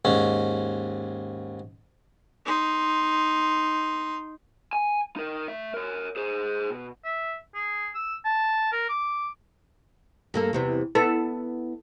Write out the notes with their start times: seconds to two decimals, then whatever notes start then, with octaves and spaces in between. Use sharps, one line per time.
0.05 D#2 G#2 C#4
2.46 D#4 C6
4.73 G#5
5.16 D#4 A#4
5.48 A3 E5
5.74 A#4 C#5
6.16 G#4 C5
6.71 B2
7.04 E5
7.54 G#4
7.95 E6
8.25 A5
8.72 A#4
8.89 D6
10.34 G2 A#3 A4
10.53 E2 C3 E3
10.95 B3 E4 A4